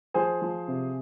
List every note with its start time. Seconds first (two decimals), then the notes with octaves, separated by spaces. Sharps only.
0.14 F3 G#4 C5
0.42 F3
0.68 C3